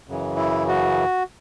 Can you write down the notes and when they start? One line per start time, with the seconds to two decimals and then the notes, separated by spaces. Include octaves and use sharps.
0.08 F#2 C#3 E3
0.37 E4
0.68 F#4